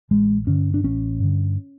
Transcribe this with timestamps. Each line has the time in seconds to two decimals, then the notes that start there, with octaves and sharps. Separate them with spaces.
0.11 A1 G#3
0.47 G2 D3 C#4
0.74 D4
0.84 A1 C#4
1.20 G2 D3